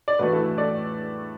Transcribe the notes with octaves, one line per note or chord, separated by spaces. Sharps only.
D5
A2 E3 A3 F#4 B4
E4 A4
A4 D5